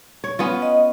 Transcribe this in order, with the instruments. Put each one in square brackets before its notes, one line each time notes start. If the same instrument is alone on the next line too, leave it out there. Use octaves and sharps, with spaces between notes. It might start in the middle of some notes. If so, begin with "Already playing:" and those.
[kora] C#5
B3 C#4 F4
[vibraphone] D#5